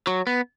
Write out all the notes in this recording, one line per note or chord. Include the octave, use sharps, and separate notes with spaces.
F#3
B3